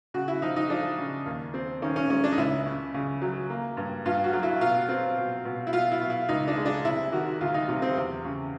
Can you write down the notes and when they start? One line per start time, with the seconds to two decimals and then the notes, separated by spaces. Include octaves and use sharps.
0.14 C#3 F#4
0.28 E4
0.42 F3 D#4
0.56 D#4
0.70 F3 D4
0.98 C#3
1.26 D#2
1.54 C4
1.82 D#3 C#4
1.96 C#4
2.10 G#3 C#4
2.24 D4
2.32 D#4
2.38 C#2 E4
2.66 C#3
2.94 C#3
3.22 F#3
3.50 A#3
3.77 G2
4.05 G2 F4
4.24 F#4
4.33 F#3
4.43 E4
4.61 B2 F4
4.89 C4
5.17 B2
5.45 B2
5.67 E4
5.73 B2 F4
5.91 E4
6.01 B2
6.10 E4
6.29 C#2 D#4
6.47 D4
6.57 G#3
6.66 D4
6.85 C3 E4
7.12 D#3 F#4
7.41 D2 F4
7.54 D#4
7.68 C3 D#4
7.82 C4
7.96 E2
8.25 C#3